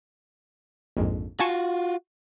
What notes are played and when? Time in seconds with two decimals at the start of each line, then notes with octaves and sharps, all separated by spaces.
0.97 A#1 F2 G#2
1.40 F4 F#4 G#5 A5 C#6